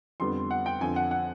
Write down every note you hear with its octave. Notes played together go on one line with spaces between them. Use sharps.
F2 D3 G3 B3 C6
F#5
G5
F2 D3 F3 G#5
F#5
F#5